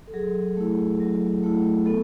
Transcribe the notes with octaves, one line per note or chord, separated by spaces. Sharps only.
A4
F#3 G#4
A3 E4
F#3
A3 E4
B3 A4